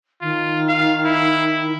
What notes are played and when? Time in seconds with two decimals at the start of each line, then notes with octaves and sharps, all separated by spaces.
0.22 D#3 F4
0.69 F5
1.05 E4